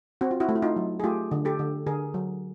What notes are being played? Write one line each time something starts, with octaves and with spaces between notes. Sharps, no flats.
C4 F#4
F4
E4 F#4
A3
E4
D#4 F4
F#3
G#4
A3 F4 G4
D3
G4 A4
D3
D3 G#4 A#4
F#3